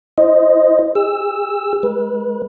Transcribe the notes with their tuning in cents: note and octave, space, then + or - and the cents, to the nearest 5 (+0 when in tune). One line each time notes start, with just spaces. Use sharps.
E4 +0 C5 +0 D#5 +0
G#4 -45 E6 +5
G#3 +15 B4 -30